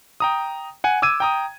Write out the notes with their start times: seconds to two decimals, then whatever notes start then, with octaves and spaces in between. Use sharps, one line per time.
0.20 G5 A#5 D#6
0.84 F#5 G#5
1.02 D6 E6 G#6 D#7
1.20 G5 A#5 D#6